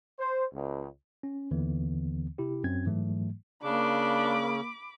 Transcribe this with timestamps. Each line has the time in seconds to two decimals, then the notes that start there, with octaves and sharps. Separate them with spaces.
0.19 C5
0.53 C#2
1.23 C#4
1.51 D#2 D3 E3 B3
2.38 C3 E4 G4
2.64 F#2 C4 G#6
2.86 G#2 E3 F#3 A3
3.63 C#3 A#3 D4 B5 D6